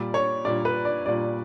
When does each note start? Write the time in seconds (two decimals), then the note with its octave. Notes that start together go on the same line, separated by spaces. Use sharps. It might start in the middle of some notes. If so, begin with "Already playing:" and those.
Already playing: A#2 G3 D5
0.14 C#5
0.45 A#2 G3 D5
0.65 B4
0.85 D5
1.06 A#2 G3 D5